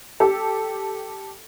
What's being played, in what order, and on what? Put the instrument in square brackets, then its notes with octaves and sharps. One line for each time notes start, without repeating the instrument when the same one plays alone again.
[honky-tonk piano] G4 A4